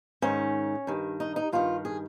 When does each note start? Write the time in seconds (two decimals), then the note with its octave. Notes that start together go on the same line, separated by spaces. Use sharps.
0.22 G#2 D#3 C#4
0.87 G2 D#3
1.20 D#4
1.36 D#4
1.52 G2 D#3 F4
1.85 G#4